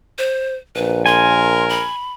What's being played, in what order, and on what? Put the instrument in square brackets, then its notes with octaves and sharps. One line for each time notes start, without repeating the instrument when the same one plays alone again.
[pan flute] C5
[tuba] A#1 [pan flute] B4
[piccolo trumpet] A#4 [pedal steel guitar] G#5 [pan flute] C6
[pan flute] B5